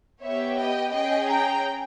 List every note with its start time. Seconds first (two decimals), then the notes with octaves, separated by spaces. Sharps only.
0.23 B3 G4 C#5 E5
0.57 D#5 G5
0.92 C#4 G#4 D#5 G5
1.28 G5 A#5